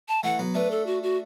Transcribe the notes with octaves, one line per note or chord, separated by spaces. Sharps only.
A5
E3 A3 F#5
F#3 B3
A3 D4 B4
A4
F#4
F#4